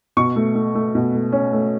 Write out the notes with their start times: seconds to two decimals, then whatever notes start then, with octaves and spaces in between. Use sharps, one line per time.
0.17 B2 C#6
0.36 A3
0.55 A3
0.75 A3
0.95 B2
1.14 A3
1.32 C#4
1.53 A3